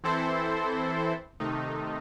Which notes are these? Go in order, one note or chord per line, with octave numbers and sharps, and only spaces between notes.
E3 C4 E4 A4 C5
C3 D#3 A3 D#4